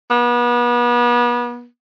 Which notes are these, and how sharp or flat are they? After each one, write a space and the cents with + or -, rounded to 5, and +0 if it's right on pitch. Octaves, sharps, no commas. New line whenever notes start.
B3 -35